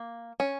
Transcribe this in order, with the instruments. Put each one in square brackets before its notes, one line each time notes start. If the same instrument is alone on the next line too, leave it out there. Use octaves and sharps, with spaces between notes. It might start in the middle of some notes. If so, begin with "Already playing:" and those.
Already playing: [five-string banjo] A#3
C#4